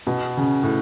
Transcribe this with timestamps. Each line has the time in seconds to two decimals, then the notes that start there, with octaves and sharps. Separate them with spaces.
0.07 B2
0.37 C#3
0.63 A2